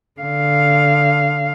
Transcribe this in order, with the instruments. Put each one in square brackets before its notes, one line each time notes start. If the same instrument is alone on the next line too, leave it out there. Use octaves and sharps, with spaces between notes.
[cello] D3 F5